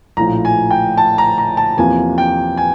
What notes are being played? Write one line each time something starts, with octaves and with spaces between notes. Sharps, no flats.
A#1 A2 F3 A#5
G#5
G5
A5
A#5
A#5
A5
E2 C3 F3 A#3 G#5
G5
G#5